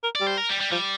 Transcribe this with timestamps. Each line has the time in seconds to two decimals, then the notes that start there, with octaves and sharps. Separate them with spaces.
0.03 A#4
0.15 D5
0.21 G3
0.27 C5
0.37 A#4
0.49 G3
0.61 G3
0.72 F3 G3